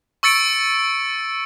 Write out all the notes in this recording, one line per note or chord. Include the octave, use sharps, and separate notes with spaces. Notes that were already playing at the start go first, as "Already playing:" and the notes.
C#6 E6 A6 C#7 D7